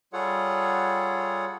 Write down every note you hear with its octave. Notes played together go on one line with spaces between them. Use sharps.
G3 F4 G#4 A4 C#5 F#5